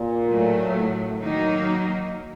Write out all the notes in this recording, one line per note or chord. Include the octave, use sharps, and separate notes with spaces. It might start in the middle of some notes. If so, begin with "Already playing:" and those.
Already playing: A#2
A2 F#3 A3
D#3 F#3 A#3 D#4